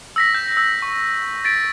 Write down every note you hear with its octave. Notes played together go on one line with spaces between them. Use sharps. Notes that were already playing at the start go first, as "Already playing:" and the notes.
E6 A#6 B6
G6
E6
C#6
A6 B6 D7